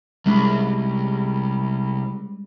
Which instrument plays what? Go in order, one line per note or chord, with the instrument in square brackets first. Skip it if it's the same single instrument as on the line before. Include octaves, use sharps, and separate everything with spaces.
[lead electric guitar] C2 [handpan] G3 G#3 C#4